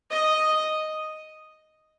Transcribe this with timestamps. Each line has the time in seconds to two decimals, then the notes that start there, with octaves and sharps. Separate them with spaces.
0.11 D#5